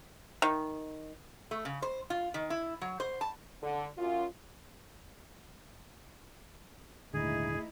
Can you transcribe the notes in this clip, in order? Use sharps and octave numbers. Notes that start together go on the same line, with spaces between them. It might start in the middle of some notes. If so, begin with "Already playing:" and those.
D#3
A3
C#3
C5
F4
D#3
E4
F#3
C5
A5
D3
F#2 F4
D#1 G#2 D3 A3 D#4 E4 G#4